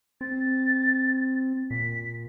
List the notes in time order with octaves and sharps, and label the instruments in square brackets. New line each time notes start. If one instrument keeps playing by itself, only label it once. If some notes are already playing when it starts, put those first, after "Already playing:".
[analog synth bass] C4 [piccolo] A6
[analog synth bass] A#2 [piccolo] B6